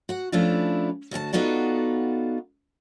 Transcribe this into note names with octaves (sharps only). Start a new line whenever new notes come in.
F#4 F#5
F3 A3 C#4 D4 E4 F4
D2 F#4 G#5 A5
B3 D#4 F4 F#4 A4 D5